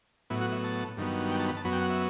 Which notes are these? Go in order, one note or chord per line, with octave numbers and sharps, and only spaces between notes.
A2 F#3 B3 E4
F#4
E5
A5
G2 D#3 F#3 B3
G5
A5
B5
A5
F#2 F#3 B3 B5
G5
F#5
E5